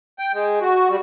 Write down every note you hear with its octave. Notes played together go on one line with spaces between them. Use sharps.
G5
G#3
F#4
G3